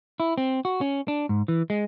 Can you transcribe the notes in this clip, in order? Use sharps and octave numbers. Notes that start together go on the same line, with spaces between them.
E4
C4
F#4
C#4
D4
G#2
E3
G#3